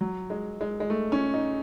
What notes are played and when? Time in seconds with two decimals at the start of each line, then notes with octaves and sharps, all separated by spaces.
0.01 F#3
0.30 G#3
0.61 G#3
0.80 G#3
0.90 A3
1.12 C#4
1.34 D#4